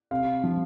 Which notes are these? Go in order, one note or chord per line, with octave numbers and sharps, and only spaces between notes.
C3 F5
F3